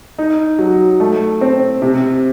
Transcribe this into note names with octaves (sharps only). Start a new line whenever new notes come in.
D#4
F#3
A3
C4
C3